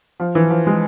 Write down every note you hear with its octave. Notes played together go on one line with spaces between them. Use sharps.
F3
E3
F3
G#3